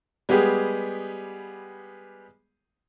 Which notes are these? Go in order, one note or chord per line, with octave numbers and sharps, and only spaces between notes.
G3 G#3 B3 G4 G#4